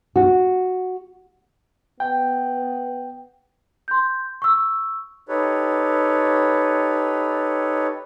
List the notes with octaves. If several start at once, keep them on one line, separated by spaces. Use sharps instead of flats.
F#4
B3 G5
C6 G6
C#6 E6
D#4 G4 A4 B4 C#5